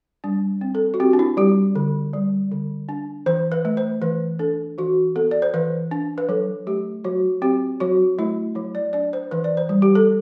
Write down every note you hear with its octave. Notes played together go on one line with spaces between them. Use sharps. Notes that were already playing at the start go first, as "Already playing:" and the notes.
G3 D4
C4
A4
F#4
C4 G4
D4
E4
G3 G4
D3
G3
D3
D4
E3 C5
B4
A3
C5
E3 B4
D4 A4
E3 F#4
B3 A4
D5
C5
E3 B4
D4
B4
F#3 A4
A3 G4
F#3 F#4
C4 G4
F#3 F#4
A3 E4
F#3 E4
D5
D4 D5
C5
E3 B4
D5
C5
G3
G4
A4